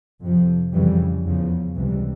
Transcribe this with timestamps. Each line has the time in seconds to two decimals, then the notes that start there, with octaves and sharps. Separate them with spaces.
0.21 F2 C3 F3
0.72 F2 C#3 E3 G3
1.25 E2 C#3 F3
1.75 C#2 C3 E3 G3